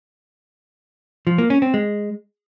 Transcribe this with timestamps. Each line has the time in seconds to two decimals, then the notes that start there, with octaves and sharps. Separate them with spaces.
1.27 F3
1.38 A#3
1.50 C#4
1.62 C4
1.74 G#3